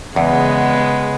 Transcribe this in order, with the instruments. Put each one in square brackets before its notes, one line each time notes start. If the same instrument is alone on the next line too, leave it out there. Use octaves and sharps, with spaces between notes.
[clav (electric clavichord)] E2 [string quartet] C#3 G#3 B3